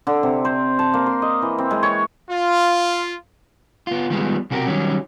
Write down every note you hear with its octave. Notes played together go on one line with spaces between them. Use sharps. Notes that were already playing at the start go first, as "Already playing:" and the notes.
D3
C3
C5
A5
A#3
C6
D#5
E3
C4
G#3
C#5
F4
B3 F4
D#3 F3 G3 G#3 B3
B1 C3 F#4 G4 A#4
D#3 F#3 G3 C#4